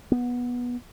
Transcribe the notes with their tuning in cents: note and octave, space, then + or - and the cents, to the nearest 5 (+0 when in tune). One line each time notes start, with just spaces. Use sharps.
B3 -15